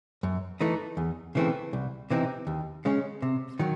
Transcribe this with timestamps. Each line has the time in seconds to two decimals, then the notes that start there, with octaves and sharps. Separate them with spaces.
0.23 F#2
0.61 E3 A3 D#4
0.97 E2
1.35 C#3 E3 A3 C4
1.73 C2
2.10 C3 E3 C4 D#4
2.47 D#2
2.85 C#3 G#3 C#4
3.22 C3
3.59 D#3 F#3